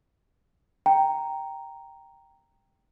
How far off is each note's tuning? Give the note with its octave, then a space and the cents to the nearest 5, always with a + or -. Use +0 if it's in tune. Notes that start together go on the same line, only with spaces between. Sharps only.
G5 +0 A#5 +0